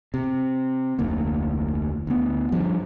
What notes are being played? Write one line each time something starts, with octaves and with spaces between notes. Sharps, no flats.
C3
F1 D2 A#3
D2 B3
G2 F3